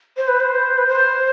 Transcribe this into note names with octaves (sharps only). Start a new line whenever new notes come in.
C5
B4
C5
B4
C5